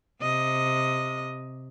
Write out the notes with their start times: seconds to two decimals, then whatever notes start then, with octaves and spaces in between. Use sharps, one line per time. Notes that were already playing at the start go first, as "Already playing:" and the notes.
0.22 C3 D#5